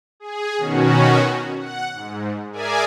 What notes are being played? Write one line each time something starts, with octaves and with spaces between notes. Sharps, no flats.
G#4
B2 D#3 C#4 F#4
F#5
G#2
G#4 A#4 D5 E5 G#5